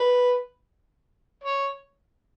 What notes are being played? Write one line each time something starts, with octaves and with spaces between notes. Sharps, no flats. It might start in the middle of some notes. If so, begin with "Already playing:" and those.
Already playing: B4
C#5